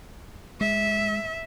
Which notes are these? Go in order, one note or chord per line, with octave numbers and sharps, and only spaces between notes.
G#3 E5